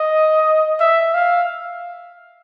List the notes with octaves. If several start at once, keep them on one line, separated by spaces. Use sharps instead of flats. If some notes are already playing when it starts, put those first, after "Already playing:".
Already playing: D#5
E5
F5